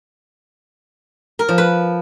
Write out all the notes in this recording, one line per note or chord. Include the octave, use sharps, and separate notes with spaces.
A#4
F3
B4